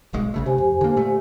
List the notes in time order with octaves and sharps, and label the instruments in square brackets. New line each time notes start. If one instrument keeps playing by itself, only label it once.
[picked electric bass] D1 B1 G#3
A#1 C#3 A3
[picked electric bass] D2 C3 [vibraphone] G4 C5 G#5
[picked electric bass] F2
D3 A#3
A#2 A3